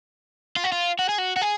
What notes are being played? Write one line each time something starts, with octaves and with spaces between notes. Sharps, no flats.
F4
F#4
F4
F#4
G#4
F#4
F#4
G#4